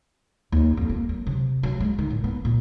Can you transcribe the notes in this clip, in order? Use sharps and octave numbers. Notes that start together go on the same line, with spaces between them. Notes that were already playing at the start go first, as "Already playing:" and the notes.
D#2
F2
A#3
F#3
C3
F#3
G#3
D#3
A2
B3
A#2